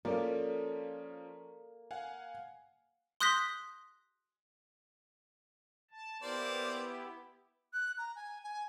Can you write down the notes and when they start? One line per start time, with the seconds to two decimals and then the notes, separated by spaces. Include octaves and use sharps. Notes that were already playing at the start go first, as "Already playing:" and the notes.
0.05 F3 A#3 C#4 A4 D5
1.91 F5 F#5 G#5
3.20 C6 D#6 F#6 G6 A#6 B6
5.91 A5
6.22 A#3 B3 E4 G4 C5 D5
7.73 F#6
7.98 A#5
8.16 G#5
8.44 G#5